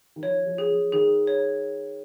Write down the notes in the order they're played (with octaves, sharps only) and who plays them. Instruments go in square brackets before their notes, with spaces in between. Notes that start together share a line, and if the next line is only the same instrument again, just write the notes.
[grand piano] D#3
[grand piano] F3 [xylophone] C#5
[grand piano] F3
[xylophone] G#4
[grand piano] F3
[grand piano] D#3 [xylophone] G#4
[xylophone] C#5